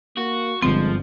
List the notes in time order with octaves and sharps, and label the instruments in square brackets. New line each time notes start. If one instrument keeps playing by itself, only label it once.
[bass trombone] A#3 [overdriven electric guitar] F#4
[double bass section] G1 [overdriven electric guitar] F3 [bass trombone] G#3 [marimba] C4